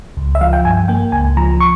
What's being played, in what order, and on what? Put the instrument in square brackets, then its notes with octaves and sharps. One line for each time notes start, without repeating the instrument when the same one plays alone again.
[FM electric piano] C#2
E5
F3 F5
G5
G2 G#5
A#3 G5
C#2 G#5
F3 A#5
C#6